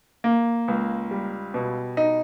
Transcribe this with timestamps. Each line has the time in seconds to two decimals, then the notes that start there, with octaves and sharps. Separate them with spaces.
0.24 A#3
0.68 C#2
1.11 G3
1.54 B2
1.97 D#4